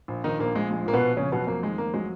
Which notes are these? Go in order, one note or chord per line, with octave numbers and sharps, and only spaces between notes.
A#1
A#1 D#3 D#4
A#1 A#3
A#1 G#3
F3 G#3
A#1 A#3
B2 B3
A#1
F2 C#3 C#4
B2 F#3 B3
F2 A#3
D#3 G#3
F2 A#3
F#3 G#3